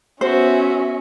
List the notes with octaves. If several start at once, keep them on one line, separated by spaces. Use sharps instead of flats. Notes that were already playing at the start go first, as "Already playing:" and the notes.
B3 C#4 F#4 C5 E5